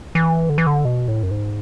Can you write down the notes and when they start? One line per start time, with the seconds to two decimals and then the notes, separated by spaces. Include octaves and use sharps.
0.15 E3
0.49 D3
0.58 E3
0.67 D3
0.85 B2
1.08 A2
1.23 F#2
1.31 G#2